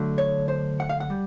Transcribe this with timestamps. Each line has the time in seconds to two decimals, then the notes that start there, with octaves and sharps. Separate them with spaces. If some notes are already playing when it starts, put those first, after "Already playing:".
Already playing: D3 F#3 A3
0.18 C#5
0.48 C5
0.80 F#5
0.89 F5
1.00 F#5
1.10 G3